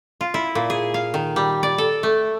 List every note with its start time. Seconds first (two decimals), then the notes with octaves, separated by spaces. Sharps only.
0.21 F4
0.34 E4
0.55 A#2
0.70 G#4
0.94 F5
1.14 D#3
1.36 G3
1.63 D5
1.78 A4
2.03 A3